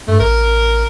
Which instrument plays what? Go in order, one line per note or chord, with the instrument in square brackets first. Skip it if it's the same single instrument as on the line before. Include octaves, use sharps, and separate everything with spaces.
[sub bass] G2 [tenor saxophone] A3
[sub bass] A1 [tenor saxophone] A#4